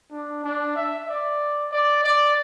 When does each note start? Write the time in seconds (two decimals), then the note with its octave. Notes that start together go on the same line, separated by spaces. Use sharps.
0.12 D4
0.44 D4
0.76 E5
1.08 D5
1.72 D5
2.04 D5